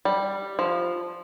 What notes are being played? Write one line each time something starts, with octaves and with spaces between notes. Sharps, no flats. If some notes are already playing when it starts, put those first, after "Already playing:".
G3
F3